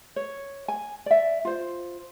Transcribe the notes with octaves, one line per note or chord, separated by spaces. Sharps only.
C#5
G#5
D5 E5
F4 C5